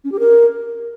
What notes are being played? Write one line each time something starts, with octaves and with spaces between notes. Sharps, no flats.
C#4
G4
A#4